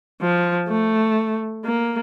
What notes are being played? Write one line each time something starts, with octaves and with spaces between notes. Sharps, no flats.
F3
A3
A#3